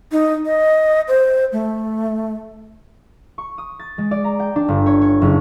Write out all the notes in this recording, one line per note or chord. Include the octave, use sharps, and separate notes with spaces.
D#4
D#5
C5
A3
C#6
D#6
A6
G#3
D5
A#5
G5
D4
G1
C#5
C#5
F#1